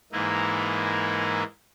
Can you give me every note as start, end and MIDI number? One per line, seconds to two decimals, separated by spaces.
0.12 1.43 44
0.12 1.43 52
0.12 1.43 58
0.12 1.43 63
0.12 1.43 64